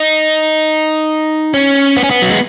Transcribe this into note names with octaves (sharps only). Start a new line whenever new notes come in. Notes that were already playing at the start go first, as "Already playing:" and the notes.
Already playing: D#4
C#4
B3
C#4
B3
F#3
G#3